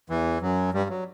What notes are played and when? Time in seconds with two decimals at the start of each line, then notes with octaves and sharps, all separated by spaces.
0.09 E2 E3
0.42 F#2 F#3
0.73 G2 G3
0.90 F#3